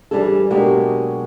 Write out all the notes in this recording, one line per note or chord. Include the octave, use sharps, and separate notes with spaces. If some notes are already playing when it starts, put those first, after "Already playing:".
E3 F3 G3 D4 G#4 A4
B2 F#3 G#3 A#3 D4 G4